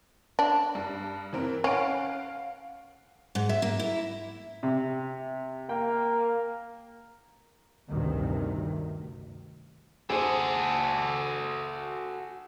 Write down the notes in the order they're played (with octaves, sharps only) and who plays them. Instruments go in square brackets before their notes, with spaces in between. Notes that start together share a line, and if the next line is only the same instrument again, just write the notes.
[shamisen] D4
[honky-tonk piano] G2
E3 C4 A#4
[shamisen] C#4 [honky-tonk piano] F5 F#5 D7
[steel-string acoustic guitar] G#2
E5
A#3
E4
[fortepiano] C3
[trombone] A#3 [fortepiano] G5
[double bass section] A1 D2 G2 C3 D#3
[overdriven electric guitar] F#4 A4 [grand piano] G#4 C5